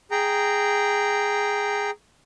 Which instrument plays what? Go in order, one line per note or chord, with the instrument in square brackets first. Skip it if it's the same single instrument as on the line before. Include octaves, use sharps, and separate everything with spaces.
[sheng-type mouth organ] G#4 G5 A#5